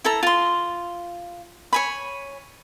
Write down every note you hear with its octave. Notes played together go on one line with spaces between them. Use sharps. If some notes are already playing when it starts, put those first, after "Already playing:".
E4 A4 A#5
F4 C6
C#5 G#5 B5